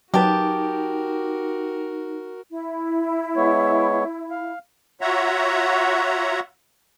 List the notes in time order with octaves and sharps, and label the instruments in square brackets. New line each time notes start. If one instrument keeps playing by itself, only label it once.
[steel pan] F#3 B4 [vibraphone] D#4 [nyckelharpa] F#4 A#4 [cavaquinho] G4 A5
[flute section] E4
[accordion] G#3 B3 C#5
F5
F4 F#4 C#5 E5 F#5 A#5